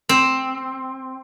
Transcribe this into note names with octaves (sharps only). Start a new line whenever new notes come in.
C4